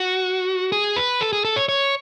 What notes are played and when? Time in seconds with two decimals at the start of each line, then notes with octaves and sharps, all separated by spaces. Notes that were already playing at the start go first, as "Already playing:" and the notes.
Already playing: F#4
0.72 G#4
0.96 B4
1.21 A4
1.33 G#4
1.45 A4
1.56 C#5
1.69 C#5